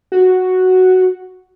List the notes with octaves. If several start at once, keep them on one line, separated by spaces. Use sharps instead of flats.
F#4